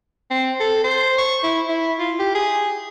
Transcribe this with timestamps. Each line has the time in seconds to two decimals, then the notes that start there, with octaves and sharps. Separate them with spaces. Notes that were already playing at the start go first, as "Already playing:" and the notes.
0.30 C4
0.60 A4
0.84 C5
1.18 C#6
1.43 E4
1.69 E4
1.99 F4
2.19 G4
2.35 G#4